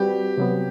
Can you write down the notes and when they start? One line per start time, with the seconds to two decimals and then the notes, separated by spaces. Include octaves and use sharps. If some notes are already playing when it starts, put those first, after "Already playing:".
Already playing: G3 C4 F#4 G4 B4
0.37 C3 F#3 B3